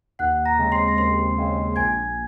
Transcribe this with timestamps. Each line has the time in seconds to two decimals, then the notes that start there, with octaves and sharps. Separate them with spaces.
0.19 D#2 F#5 F#6
0.45 A#5 A#6
0.59 C#3 G#3 C4
0.72 C6 C7
0.88 A#6
0.98 D#2 C6 C7
1.37 C#3 G#3 C4
1.76 A#1 G#5 G#6